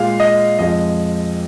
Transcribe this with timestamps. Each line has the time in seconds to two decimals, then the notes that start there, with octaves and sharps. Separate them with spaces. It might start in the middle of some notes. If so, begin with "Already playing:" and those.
Already playing: A#2 G#3 F5
0.20 D#5
0.59 F2 F3 G#3 D#5